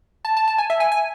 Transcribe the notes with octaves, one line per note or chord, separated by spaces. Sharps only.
A5
A5
A5
G#5
E5
G#5
G#5